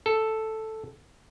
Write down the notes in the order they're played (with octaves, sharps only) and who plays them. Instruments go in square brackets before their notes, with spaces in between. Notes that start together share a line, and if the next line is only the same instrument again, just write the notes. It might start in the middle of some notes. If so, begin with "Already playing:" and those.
[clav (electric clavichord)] A4